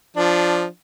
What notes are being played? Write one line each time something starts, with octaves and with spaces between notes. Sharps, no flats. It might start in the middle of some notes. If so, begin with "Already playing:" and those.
F3 D4